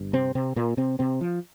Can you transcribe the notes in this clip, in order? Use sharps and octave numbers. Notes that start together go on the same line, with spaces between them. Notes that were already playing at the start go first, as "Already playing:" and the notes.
Already playing: G1 G2
C3 C4
C3 C4
A#2 A#3
C3 C4
C3 C4
F3